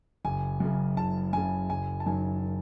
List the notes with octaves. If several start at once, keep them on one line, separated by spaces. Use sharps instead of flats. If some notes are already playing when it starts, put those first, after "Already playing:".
F#1 G#5
F#2 C#3
F#1 A5
F#2 C#3 G#5
F#1 G#5
A5
F#2 D#3 F#3 G#5